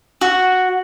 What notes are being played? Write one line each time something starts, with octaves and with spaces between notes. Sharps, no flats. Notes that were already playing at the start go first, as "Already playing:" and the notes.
F#4